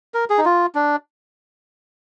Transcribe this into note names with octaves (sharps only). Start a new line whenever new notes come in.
A#4
G#4
D#4
F4
D4